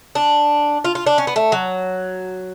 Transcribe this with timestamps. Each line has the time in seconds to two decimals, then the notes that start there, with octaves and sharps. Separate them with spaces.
0.15 D4
0.84 F4
0.95 F4
1.06 D4
1.18 C#4
1.27 B3
1.36 A3
1.52 F#3